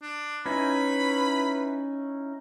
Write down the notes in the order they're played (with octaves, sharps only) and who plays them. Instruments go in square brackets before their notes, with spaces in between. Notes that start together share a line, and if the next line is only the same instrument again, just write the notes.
[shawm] D4
[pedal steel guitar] C#4 D#4 E4 [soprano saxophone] B4 [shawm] B5